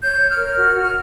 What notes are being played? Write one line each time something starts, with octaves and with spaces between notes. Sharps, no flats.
C#5 G6
C#5
F6
A#4
F#4
F#4